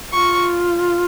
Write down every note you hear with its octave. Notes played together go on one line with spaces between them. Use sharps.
F4 C#6